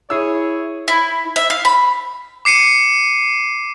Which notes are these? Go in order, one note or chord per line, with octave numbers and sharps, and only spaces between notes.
E4 G#4 C#5 D#6 E6
E4
E5
F5
B5
D6 C7 C#7 D#7